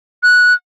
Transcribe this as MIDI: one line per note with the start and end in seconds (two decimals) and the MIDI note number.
0.23 0.54 90